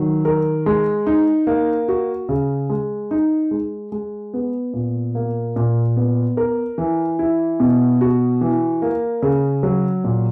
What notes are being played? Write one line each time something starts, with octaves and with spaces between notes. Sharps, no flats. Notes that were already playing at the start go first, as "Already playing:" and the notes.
Already playing: D#3 F#3
A#4
G#3
D#4
A#3
F#4
C#3
G#3
D#4
G#3
G#3
B3
A#2
A#3
A#2
B3
A#4
E3
E4
B2
F#4
E3
A#3
C#3
F#3
A#2